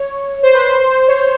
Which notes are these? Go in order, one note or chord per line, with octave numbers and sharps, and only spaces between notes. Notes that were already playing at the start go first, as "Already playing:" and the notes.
Already playing: C#5
C5
B4
C5
C#5